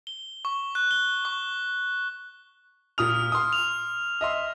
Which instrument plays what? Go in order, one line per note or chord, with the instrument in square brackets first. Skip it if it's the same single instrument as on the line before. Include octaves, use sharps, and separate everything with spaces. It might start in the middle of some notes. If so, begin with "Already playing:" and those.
[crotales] G7
C#6
F#6
G7
C#6
[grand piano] A#2 D#6 F7 [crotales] F6
[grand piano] C6 D#6
[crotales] F7
[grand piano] D#5 E5 C6